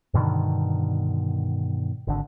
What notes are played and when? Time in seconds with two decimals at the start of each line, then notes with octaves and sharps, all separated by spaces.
0.14 G2 B2 D3 D#3
2.07 G#1 D3